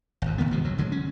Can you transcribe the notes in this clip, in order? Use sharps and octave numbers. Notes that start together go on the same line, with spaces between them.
G#1 F2
C2 D#3 A#3 B3
G#2 C3 D#3 F3
D2 F#3
D2 D3 F#3 G#3
C#4